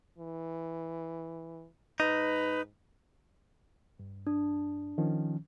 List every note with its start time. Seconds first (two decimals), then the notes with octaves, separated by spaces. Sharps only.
0.18 E3
2.00 G#2 D#4 B4
3.99 G2
4.27 D4
4.98 D#3 F3 C#4